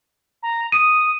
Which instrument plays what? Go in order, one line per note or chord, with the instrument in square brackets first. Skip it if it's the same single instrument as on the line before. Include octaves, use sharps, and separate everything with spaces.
[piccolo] A#5
[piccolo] D#6 [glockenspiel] D#7